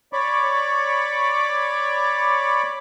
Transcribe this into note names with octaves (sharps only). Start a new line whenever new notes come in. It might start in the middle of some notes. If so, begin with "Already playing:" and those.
C#5 D5 B5 C#6 D6